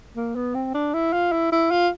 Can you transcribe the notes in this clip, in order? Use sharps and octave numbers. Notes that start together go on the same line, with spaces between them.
A#3
B3
C4
D4
E4
F4
E4
E4
F4